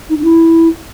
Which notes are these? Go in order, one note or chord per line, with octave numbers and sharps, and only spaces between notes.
D#4
D4
E4